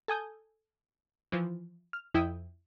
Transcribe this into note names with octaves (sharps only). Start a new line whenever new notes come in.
A4 G#5 D#6 G6
E3 F3
F6
F2 E4 G5 D#6